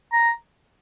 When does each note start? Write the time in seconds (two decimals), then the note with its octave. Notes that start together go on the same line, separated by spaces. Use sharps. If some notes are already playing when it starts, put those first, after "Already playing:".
0.13 A#5